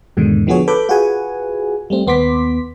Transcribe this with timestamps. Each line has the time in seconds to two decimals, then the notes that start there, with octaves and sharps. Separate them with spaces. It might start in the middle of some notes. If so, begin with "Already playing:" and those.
0.17 E2 G#2 B2 D3 D#3
0.47 D3 F3 B3 F#4 G#4 C#5
0.68 A4 B4 B5 D6 G6
0.89 F4 F#4 G#4 B4 F#5 G#5
1.90 G3 A3 C4
2.07 D#2 B3 C6 D6 B6